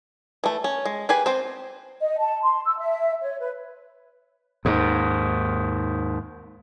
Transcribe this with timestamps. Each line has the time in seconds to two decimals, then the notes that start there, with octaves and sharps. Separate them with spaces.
0.44 E3 A3
0.64 C#4
0.85 G#3
1.09 G4 G#4 B4 G#5
1.26 C4 C5
2.01 D#5
2.21 A5
2.43 C6
2.65 E6
2.79 E5
3.22 C#5
3.40 B4
4.65 D#2 G#2